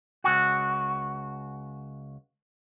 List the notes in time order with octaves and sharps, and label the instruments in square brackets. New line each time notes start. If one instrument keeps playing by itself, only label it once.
[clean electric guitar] C#2 F#4